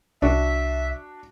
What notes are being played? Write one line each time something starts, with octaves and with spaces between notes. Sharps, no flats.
C2 D4 F#4 E5